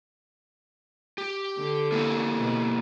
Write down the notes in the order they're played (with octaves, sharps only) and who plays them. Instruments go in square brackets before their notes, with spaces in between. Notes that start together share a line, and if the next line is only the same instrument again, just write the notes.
[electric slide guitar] G4
[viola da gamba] D3
[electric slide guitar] A#3 E4 G4
[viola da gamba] B2